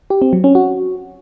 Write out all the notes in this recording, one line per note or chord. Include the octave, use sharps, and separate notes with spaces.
G4
C4
F#3
C#4
F#4